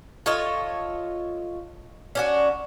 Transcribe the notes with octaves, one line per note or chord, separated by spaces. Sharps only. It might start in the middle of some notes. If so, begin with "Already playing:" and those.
F4 A4 C#5 D#5
C#4 D4 F#4